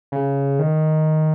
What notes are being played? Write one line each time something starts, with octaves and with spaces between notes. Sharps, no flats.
C#3
D#3